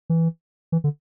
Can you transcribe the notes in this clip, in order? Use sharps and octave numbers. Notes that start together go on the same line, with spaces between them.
E3
E3
D3